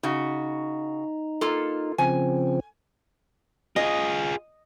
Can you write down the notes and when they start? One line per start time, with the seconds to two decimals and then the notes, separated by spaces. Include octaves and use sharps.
0.03 C#3 D#4 F#4
1.41 A#3 F4 A4
1.98 C#3 F3 C4 G#5
3.76 F4 G#4 D#5